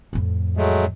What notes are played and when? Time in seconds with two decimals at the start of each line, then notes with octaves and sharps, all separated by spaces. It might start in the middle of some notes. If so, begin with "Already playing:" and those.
0.13 F2 A2
0.57 F#3 G#3 A3